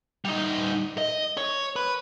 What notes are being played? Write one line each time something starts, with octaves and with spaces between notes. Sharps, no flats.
G3 D#4
D#5
C#5
B4